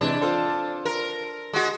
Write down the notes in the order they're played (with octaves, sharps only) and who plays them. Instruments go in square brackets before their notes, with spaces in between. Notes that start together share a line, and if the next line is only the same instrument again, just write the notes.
[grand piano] C3 E3 G#3 [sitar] D4
[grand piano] F4 A4 C5
[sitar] A#4
G#3 F#4